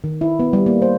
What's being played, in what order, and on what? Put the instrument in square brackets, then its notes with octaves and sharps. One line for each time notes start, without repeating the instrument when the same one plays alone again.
[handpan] D#3
E4
B3
G3
A#3
C5